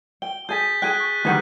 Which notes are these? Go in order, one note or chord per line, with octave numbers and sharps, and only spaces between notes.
G5 G7
G#4 G#5 G6 A6 B6
G#4 G5 F#6
C#6
D2 D#3 G3 G#4 B4 F#5